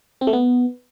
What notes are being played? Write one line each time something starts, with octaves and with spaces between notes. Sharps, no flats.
C4
A3
B3